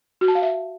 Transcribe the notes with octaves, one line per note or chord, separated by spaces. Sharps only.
F#4
A5
F5
E5